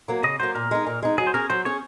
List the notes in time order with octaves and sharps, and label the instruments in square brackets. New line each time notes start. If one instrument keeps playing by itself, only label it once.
[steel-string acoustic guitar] F#3 A#3
[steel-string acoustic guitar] C#3 [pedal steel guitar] D#5
[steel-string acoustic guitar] F#3 A#3 [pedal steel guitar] C5
[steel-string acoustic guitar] A#2 [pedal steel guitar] A#4
[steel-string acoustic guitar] G#3 D#4
A#2
G#3 D#4
[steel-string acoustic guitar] F#3 [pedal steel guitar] G#4
[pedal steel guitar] C5
[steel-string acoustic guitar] C#4 G#4 [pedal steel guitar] A#4
[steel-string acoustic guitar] F#3 [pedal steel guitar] C5
[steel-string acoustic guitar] C#4 G#4 [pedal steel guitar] C#5